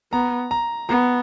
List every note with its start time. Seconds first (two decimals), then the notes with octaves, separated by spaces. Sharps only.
0.13 B3 A#5
0.51 A#5
0.89 B3 A#5